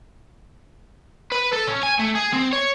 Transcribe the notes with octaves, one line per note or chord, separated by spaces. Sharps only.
B4
A4
C#4
G#5
A3
G#4
C4
C#5